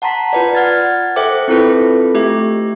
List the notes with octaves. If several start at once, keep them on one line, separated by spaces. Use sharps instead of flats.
F#5 A5 A#5 C6 B6
F4 B4 D5
F#5 F6 G#6 A6
A4 C5 E5 G5 D6
C4 E4 F4 A4 B4
A3 G4 E5